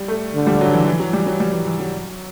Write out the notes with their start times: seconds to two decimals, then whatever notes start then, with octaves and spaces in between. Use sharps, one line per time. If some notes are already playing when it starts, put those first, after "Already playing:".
Already playing: G3
0.08 A3
0.34 D3
0.47 G3
0.61 F#3
0.73 E3
0.87 E3
1.00 F#3
1.13 G3
1.26 F#3
1.40 G3
1.53 E3
1.66 E3
1.80 F#3